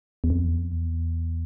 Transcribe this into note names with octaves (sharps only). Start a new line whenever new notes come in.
E2
F2
E2
F2
E2